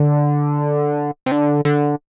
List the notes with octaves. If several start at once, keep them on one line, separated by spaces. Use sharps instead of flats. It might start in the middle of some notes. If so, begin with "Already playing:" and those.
Already playing: D3
C3
D3
D3